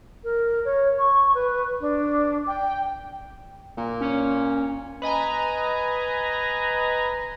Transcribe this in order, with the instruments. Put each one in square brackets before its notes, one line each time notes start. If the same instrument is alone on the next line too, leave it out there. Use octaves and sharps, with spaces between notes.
[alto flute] A#4
C#5
C#6
B4
D4
G5
[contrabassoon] A#2
[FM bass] C#4
[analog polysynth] B4 D#5 G#5 A#5